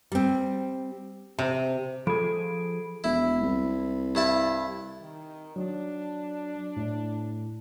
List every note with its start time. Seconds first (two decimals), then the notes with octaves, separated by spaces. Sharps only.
0.12 G3 C4
1.39 C3
2.07 F3 G#4 A4 B5 D7
3.04 E1 E4
3.41 C2
4.15 G2 E4 A5
5.02 D#3
5.56 F#3 D4
6.77 A2